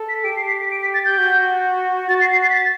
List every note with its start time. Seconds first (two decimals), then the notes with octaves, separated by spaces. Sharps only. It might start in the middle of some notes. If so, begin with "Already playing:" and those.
Already playing: A4
0.09 B6
0.24 G4 D7
0.37 C7
0.48 B6
0.60 B6
0.71 D7
0.82 B6
0.94 A6
1.06 G6
1.17 F#4
2.09 F#4 A6
2.21 C7
2.32 C7
2.44 A6
2.50 B6
2.56 A6